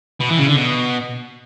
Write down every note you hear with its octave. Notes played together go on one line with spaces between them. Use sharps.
B2
E3
C#3
D3
B2